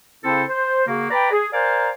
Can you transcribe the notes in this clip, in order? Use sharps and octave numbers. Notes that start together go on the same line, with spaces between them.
C#3 C4 E4 A4 C5 A5
C5
C#3 A#3 F#4
B4 D5 G5 A#5 B5
G#4
A#4 C5 D5 F5 G#5 A#5